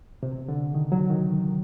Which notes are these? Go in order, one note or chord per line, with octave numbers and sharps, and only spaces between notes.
C3
D3
D#3
F#3
D#3